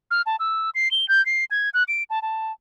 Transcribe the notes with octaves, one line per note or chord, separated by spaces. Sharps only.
F6
A5
E6
C7
G7
G6
C7
G#6
F#6
D7
A5
A5